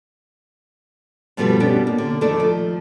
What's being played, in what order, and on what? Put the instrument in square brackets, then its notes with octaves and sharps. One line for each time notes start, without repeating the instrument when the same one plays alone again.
[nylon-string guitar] G2 B2 F3 G3 A3 B4
B2 C#4 D4 G4
A#3
D3
F2 D#3 A3 A4 D5
F3